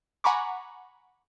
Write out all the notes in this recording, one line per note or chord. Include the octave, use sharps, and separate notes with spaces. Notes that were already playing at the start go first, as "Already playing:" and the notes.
F#5 G#5 A#5 B5 C#6 D6